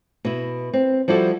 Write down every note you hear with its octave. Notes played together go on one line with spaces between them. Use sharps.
B2 E4
C4
F3 G3 E4 F#4 A4